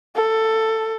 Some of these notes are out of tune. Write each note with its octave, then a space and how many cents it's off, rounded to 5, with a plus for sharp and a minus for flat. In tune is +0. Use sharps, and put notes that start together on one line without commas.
A4 +15